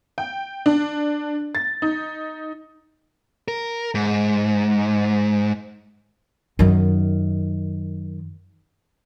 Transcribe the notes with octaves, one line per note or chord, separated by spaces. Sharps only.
G5
D4
A6
D#4
A#4
G#2
F#2 D#3